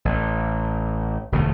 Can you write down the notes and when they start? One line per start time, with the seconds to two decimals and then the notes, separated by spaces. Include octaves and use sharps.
0.05 A1
1.32 E1 D2 A3